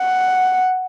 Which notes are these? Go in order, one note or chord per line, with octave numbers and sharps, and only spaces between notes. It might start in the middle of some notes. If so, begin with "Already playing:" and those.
Already playing: F#5